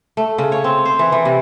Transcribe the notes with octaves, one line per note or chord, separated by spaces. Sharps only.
A3
C#3
C#5
C4
C5
E3
E3
C3